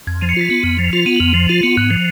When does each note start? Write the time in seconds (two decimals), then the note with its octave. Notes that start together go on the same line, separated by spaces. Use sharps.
0.07 F2 G#6
0.21 F3 D#7
0.29 C#7
0.36 F4 B6
0.50 B3 C#7
0.63 F2
0.79 F3
0.93 F4 F7
1.06 B3 D#7
1.16 F#7
1.20 F2 F7
1.34 F3 F7
1.49 F4 D#7
1.63 B3 C#7
1.77 G#2 F#6
1.91 F3